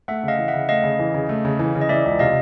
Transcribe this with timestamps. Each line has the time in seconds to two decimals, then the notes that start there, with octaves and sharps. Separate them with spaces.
0.08 A3 E5 F#5
0.23 C#3 D#5 F5
0.39 E3
0.48 E5 F#5
0.54 C#3
0.69 A3 D#5 F5
0.84 C#3
0.99 E3
1.14 C#3
1.29 A3
1.45 C#3
1.59 E3
1.75 C#3
1.81 D#5
1.89 E3 D5 E5
2.05 C#2
2.19 C3 D#5 F5